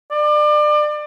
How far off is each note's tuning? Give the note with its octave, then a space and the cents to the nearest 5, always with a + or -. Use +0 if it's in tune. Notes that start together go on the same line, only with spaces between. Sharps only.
D5 +30